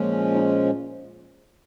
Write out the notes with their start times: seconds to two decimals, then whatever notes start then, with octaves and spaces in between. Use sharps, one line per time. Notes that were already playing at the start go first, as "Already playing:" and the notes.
Already playing: A#2 F3 G#3 C#4
0.34 D#4
0.65 F4